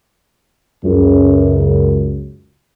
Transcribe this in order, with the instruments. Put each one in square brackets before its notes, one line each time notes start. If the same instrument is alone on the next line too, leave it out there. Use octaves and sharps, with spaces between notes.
[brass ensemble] C#2 F#2